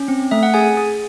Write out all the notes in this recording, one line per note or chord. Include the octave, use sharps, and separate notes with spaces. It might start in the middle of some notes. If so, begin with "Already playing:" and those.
Already playing: C#4
C4
A3 E5
F#5
G#4 G#5
G#4